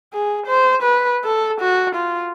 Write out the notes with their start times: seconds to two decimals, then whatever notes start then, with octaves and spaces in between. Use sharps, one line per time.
0.13 G#4
0.46 C5
0.82 B4
1.24 A4
1.60 F#4
1.95 F4